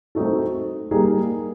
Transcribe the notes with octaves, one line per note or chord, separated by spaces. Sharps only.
A3 C4 D#4 F#4 A4
G3 A#3 D#4 G#4